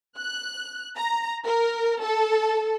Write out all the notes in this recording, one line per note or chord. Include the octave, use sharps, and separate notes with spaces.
F#6
A#5
A#4
A4